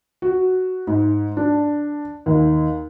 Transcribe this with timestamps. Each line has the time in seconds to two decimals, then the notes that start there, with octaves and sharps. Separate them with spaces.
0.22 F#4
0.87 G#2
1.37 D4
2.26 D#2